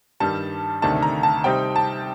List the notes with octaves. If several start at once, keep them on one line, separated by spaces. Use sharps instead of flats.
G2 D#3 G3 A5
D2 C3 D#3 A3 D4 A5
A#5
A5
C3 G3 C4 D#4 G5
A5